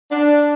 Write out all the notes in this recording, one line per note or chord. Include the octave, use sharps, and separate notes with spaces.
D4